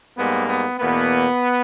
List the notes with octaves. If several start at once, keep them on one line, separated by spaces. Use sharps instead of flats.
G#2 G3 A#3 B3
B3
E2 B2 A#3 B3